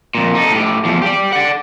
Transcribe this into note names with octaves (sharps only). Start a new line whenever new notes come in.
F2 A#2
D#4 A4
A2 G4
E2 F3
G4 D5
D5 F#5